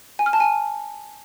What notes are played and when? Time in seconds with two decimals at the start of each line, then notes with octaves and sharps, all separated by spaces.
0.19 G#5
0.26 F6
0.33 A5
0.40 G#5